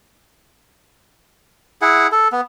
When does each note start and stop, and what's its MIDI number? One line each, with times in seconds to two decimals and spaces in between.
1.82 2.07 64
1.82 2.07 68
1.82 2.07 78
2.12 2.28 69
2.32 2.41 59